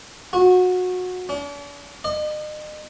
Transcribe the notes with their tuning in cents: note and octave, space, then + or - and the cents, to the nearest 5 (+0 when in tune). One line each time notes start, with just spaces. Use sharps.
F#4 -20
D4 -45
D#5 -40